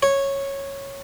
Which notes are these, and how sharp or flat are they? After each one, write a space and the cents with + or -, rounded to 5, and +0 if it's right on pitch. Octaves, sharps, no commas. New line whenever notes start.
C#5 -10